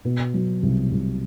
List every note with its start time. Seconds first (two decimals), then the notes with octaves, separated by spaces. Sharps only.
0.05 B2
0.34 F#3
0.63 C2
0.92 C2